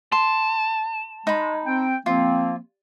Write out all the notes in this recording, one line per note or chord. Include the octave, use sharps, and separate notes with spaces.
A5 C6
G#3 D#4 B5
C4 G5
F3 A#3 C4 F4